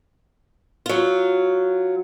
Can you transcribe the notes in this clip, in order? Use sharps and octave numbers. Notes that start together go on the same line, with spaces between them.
F#3 F4